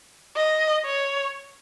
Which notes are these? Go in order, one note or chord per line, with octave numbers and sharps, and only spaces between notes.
D#5
C#5